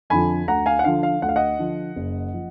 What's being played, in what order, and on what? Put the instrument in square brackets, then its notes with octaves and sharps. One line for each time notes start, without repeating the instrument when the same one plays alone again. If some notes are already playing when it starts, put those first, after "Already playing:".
[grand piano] F2 D3 F3 G#5 B5
D2 F#5 A#5
F5 G#5
F#5
D3 F3 F5
F5
D2 F#5
F5
D#5 F#5
D3 F3
F#1
F3